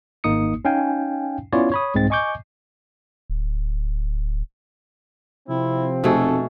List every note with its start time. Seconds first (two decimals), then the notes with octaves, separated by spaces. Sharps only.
0.24 G#1 A#3 D#4 D#6 C#7
0.65 C#4 D#4 F5 G5 G#5
1.53 B3 C#4 E4 F4 C#5 D5
1.72 C#5 B5 D#6
1.94 C2 G#2 G#3 C4 A6
2.10 D#5 G#5 C#6 D6 G6
3.30 D1
5.49 C3 F3 C4 E4
6.04 F1 B2 A3 G#4 A4